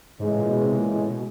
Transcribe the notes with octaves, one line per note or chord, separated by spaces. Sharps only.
G#2 C#3 E3 G#3
A2
A#2
B2
C3
A#2
A2
B2